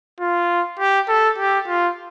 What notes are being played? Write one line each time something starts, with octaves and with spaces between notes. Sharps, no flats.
F4
G4
A4
G4
F4